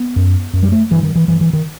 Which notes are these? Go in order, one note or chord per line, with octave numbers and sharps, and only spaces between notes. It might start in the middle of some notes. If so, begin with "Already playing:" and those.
Already playing: B3
F#2
F#2
G3
A3
G2 E3
D#3
E3
G2 E3
E3
D#3